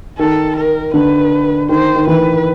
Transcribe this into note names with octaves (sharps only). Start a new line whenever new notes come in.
D#3 A4
A#4
D3 B4
D#3 C5
D#3
E3 B4